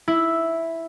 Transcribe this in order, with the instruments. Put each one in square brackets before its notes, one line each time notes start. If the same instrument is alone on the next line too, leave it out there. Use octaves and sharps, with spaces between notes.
[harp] E4